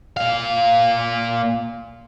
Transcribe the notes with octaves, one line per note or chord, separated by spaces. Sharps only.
A#2 F5